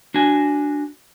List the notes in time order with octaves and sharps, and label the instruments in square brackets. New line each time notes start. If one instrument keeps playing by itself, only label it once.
[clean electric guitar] D4 F#4 G#5